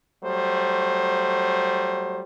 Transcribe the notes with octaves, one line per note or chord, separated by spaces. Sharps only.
F#3 G3 A3 C5